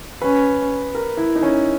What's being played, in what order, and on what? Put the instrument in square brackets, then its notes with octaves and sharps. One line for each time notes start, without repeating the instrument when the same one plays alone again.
[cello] C#4 [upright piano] B4
[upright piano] A#4
E4
D#4
C#4